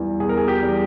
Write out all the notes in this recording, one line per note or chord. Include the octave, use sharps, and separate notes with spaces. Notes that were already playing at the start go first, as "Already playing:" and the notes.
Already playing: E2 E3 G3
E2 G#4
A#4
G#4
G4
E3 G3